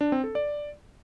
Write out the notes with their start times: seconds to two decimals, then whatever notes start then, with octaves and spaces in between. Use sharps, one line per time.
0.01 D4
0.12 C4
0.24 A4
0.35 D5